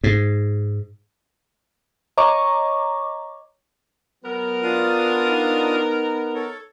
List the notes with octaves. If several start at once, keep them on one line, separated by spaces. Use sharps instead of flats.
G#2
C#5 D#5 A#5 C#6 D6
F#3 B3 A#4
D4 F4 D#6
D#4
A4 C#5